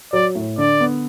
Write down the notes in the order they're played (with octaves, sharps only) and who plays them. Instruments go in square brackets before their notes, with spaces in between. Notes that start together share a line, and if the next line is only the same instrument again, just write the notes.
[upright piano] F#3 [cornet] D5
[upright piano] A2
[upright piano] D3 [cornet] D5
[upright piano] B3